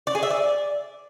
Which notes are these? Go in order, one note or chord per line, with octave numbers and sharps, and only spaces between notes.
D5
G#4
E5
D5